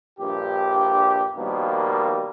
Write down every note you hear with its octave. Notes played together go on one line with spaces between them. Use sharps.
A#1 G2 G4
B2 D#3 F3 G3 A#3